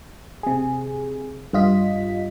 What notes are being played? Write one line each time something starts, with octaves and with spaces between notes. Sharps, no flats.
C3 G#4
G2 G3 F4 D#5 B6